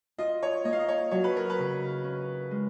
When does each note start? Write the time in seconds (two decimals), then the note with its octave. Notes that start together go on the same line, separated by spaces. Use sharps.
0.18 F4 D#5
0.43 C#5
0.65 A#3 D#5
0.72 F5
0.79 D#5
0.88 C#5
1.11 F#3 C#5
1.24 B4
1.37 A#4
1.50 B4
1.58 C#3
2.04 C#4
2.51 G#3